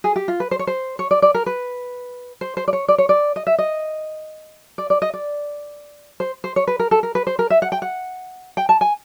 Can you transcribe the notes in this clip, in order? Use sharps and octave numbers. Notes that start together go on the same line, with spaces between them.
G#4
G4
F4
B4
C5
C#5
C5
C#5
D5
D5
A#4
B4
C5
C5
D5
C#5
D5
C#5
D5
D#5
E5
D#5
D5
D5
D#5
D5
C5
C5
C#5
B4
A#4
A4
A#4
B4
C5
A#4
E5
F#5
G5
F#5
G5
A5
G#5